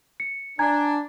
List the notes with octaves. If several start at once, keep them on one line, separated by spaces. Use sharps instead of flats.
C#7
D4 G#5 A#5 G#6